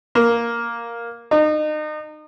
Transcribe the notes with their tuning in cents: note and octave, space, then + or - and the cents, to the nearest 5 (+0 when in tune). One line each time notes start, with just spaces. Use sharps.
A#3 +5
D#4 -30